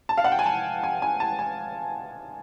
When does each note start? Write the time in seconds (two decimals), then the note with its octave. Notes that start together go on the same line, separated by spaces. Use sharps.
0.09 A5
0.18 F5
0.24 F#5
0.32 G5
0.39 G#5
0.46 A5
0.83 G#5
1.02 G#5
1.20 A5
1.39 G#5